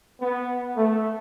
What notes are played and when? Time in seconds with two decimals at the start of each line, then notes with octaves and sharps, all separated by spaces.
0.21 B3
0.77 A3